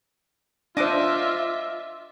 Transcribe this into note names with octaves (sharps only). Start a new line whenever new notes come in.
D4 F4 C5 D#5 E5 D6 F#6